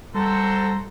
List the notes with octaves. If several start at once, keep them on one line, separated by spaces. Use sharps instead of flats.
G3 C4 F#4 A4 C5 A#5 C6